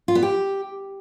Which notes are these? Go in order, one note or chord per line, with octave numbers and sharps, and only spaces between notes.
F4
B3
G4